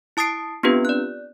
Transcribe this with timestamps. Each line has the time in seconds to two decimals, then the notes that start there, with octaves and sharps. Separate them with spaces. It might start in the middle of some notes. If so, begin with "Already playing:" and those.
0.17 E4 A5 D#6 A6 C7 D7
0.63 B3 C4 D4 F4 G4 B4
0.85 D5 F#6